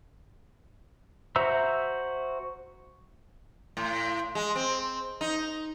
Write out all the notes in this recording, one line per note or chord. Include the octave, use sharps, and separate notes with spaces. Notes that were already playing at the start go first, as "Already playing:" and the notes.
F#4 C5 E5 A#5 E6
A2
G#3
C4
D#4